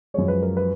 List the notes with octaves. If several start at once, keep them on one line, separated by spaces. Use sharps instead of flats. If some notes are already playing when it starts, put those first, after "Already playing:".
F#2 F3 G#3 C#5
B4
A#4
B4